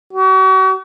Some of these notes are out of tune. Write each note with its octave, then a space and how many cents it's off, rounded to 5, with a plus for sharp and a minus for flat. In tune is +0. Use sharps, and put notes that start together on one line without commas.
F#4 +40